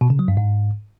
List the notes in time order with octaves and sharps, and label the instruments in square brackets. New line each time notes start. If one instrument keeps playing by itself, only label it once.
[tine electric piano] B2
C#3
F#3
G2
G#2